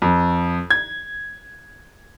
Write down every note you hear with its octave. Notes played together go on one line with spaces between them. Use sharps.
F2
G#6